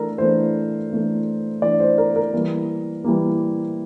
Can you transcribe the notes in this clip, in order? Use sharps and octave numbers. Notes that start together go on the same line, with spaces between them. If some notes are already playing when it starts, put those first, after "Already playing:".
Already playing: E3 A3 D4 A4 A#4
E3 A3 D4 C5
E3 A3 D4
E3 A3 D4 D5
C5
A#4
A#4
E3 G3 A#3
E3 G3 A#3